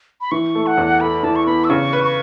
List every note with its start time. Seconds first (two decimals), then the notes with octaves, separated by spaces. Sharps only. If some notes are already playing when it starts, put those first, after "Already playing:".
0.21 B5
0.31 E3 C#6
0.55 A3
0.67 F#5
0.77 E2
1.00 A4 B5
1.23 E3 A5
1.36 C#6
1.46 B3 B5
1.64 E6
1.70 C#3 C#6
1.93 B4
2.04 C#6